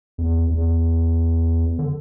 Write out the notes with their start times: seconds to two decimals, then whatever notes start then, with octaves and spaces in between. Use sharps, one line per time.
0.18 E2
0.50 E2
1.79 D3